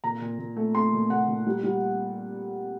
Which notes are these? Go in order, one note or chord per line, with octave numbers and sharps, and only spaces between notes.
A#2 A#5
A#2
A#2
A3
A3 C6
A#2
A#2 F#5
A#2
G3
G3